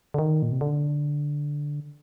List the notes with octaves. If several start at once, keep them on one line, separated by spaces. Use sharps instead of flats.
D3
D#3
A#2
C3
D3